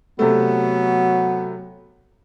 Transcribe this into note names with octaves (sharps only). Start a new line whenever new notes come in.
C3 F#3 A3 B3